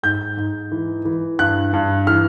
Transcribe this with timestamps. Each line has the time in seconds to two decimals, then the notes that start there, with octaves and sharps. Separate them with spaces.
0.03 G#2 G6
0.37 G#2
0.72 E3
1.05 E3
1.39 G2 F#6
1.73 G2
2.07 E3 F6